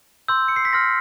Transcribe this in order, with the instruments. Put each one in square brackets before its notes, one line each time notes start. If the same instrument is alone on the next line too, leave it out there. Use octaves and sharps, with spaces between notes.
[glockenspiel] C6 E6 G6
C#7
C7
B6
C6 F6 A#6